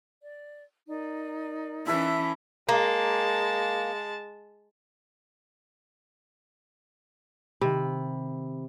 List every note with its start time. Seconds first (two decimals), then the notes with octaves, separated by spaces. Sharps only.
0.21 D5
0.88 D#4 A#4 D5
1.87 E3 C#4 E4 A4 B4 E5
2.69 G#3 A#3 A5
7.61 C3 D#3 B5